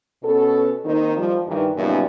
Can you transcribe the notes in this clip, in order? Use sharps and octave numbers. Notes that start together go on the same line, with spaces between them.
B2 B3 C#4 A4
D#3 A#3 C4 D#4
F3 G3
G2 D#3 E3 G3 D#4
F#2 A#2 C#3 G3 B3 D#4